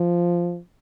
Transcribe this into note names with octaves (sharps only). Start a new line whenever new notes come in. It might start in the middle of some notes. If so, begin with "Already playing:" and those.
Already playing: F3